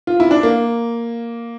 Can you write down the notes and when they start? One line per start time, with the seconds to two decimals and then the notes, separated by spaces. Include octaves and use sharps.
0.07 F4
0.20 E4
0.31 D4
0.43 A#3